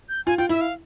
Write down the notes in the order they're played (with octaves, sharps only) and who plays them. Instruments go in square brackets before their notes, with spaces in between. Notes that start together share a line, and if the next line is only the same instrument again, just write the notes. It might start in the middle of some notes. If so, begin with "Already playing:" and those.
[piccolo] G6
[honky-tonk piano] F4 [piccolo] G#5
[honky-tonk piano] F4 [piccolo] G5
[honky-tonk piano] E4 [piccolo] E5
[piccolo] F5